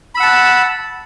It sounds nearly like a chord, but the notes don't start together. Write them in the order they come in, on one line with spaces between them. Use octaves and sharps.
B5 E6 F#5 A5